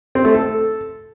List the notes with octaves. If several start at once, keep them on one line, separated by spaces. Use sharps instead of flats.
C4
A3
A4